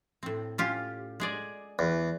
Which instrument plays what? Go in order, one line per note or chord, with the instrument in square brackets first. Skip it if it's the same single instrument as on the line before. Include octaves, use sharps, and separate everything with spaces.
[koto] A2 C4
C#4 F4 G4
G#3 G#4 D5
[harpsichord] E2